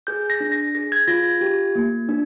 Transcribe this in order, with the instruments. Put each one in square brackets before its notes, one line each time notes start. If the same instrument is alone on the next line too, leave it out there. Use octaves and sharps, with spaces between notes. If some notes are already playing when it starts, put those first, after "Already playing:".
[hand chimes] G#4 G6
A#6
D4
A#6
G#4 A#6
G#6
F4 A#6
G#6
G4
A#3
D4